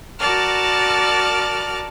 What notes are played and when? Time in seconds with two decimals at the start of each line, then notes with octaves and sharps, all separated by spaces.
0.19 F#4 A#4 D5 A5 F6